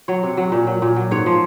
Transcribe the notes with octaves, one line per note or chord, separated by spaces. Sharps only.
F#3 C#5
C3
F#3
A#2
F#3
A#2
F#3
G#2 C#5
F3